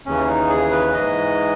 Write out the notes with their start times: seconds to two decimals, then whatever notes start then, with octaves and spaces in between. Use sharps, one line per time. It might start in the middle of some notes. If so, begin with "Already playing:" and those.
0.06 D#2 C#3 E3 C#4
0.29 D#4
0.49 G#4
0.71 B4
0.94 G#2 E3 D#5